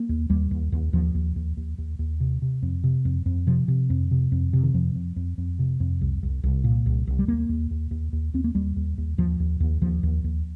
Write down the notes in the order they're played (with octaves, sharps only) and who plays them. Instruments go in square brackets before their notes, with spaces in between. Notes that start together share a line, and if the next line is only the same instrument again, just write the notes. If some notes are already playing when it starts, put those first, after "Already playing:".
Already playing: [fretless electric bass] A#3
D#2
D#2 G3
D#2
D#2
D#2 F3
D#2
D#2
D#2
D#2
D#2
C3
C3
F2
C3
F2
F2
C3 F3
C3
F2
C3
F2
C3
D#3
F2 F3
F2
F2
F2
C3
F2
C2
C2
C2
A#2
C2
C2
G3
D#2 A#3
D#2
D#2
D#2
D#2
D#2 C4
A#3
D#2 G3
D#2
D#2
D#2 F3
D#2
D#2
D#2 F3
D#2
D#2